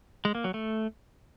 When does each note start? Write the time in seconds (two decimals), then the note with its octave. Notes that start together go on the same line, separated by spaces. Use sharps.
0.25 G#3
0.35 A#3
0.44 F#3
0.54 A3